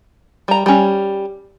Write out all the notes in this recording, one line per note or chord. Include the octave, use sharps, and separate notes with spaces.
G3 A#5
G3 C#4